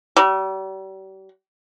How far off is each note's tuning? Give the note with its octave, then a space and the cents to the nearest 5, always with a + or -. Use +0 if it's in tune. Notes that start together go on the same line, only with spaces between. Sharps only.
G3 -40